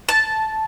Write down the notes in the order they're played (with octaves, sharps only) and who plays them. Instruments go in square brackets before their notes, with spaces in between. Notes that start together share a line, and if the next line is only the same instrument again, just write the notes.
[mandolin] A5